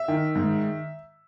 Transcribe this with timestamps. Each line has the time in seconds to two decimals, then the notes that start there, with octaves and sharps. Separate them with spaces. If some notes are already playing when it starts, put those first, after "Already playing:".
Already playing: E5
0.08 D#3
0.36 G#2